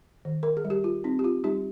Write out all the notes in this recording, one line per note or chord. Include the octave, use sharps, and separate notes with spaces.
D#3
A#4
G#4
G3
G4
F4
C4 D#4
G4
F4
G3 D#4 G4